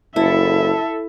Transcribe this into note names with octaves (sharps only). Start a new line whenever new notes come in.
F#1 E4 A4 E5